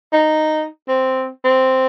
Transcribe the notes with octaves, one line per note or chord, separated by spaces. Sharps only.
D#4
C4
C4